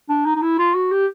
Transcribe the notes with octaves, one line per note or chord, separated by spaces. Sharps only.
D4
D#4
D#4
E4
F4
F#4
G4